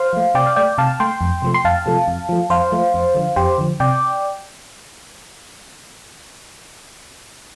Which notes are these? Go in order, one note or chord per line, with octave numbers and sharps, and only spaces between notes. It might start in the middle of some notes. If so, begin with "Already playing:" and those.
Already playing: C5 F5
F3 A3
C3 D5 G5
F5
A3 D5 G5
C3 F5 A5
A3 G5 C6
F2
C3 F3 A3
C6
F2 F5 A5
C3 F3 A3
F2
F3 A3
F2 C5 F5
F3 A3
F2
D3 F3
F2 G4 C5
D3 F3
C3 D5 G5